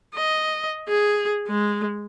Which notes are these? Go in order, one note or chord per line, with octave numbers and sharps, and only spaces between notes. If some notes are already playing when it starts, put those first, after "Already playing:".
D#5
G#4
G#3